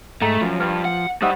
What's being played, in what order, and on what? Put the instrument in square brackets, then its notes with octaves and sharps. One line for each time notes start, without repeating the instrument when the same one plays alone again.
[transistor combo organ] G#2 [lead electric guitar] A3 [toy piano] D#5 G5 A#5
[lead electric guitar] F#2 [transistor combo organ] F3
[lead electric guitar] G2 [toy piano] B4 G5
[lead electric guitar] F#5
[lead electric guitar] G3 [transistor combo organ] D#4 D#5 E5 [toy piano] G4 C5 F#5